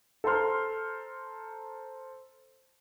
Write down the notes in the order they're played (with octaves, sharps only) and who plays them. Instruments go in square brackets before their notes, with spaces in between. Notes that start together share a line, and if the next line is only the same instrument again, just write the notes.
[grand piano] A4 C5 A#5 C6 F6